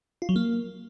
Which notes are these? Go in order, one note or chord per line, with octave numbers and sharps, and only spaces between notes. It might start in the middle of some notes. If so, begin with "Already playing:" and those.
F4
F#3
A#3